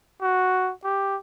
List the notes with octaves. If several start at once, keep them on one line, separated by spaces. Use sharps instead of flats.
F#4
G4